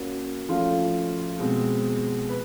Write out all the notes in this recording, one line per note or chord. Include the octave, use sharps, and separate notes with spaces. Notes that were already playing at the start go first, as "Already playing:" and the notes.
Already playing: A#3 C#4 F#4
F3 A3 C#4 F4
B2 G#3 C4
B4